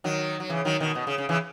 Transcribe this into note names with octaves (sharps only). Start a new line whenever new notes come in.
D#3 F#3
F#3
C#3 E3
D#3 F#3
B2 D#3
B2
C#3
C#3
C#3 E3